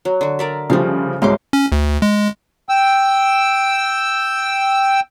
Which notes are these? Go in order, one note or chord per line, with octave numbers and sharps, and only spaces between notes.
F#3
D3 F#4
A#4 D5 E5
C#3 F3 G3 A3 F5
C2 G#2 F#3 G#3 C6 D6
C#4
D2
G#3
G5 E6